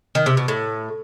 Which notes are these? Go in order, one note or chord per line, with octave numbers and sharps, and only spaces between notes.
D#3
C3
B2
A2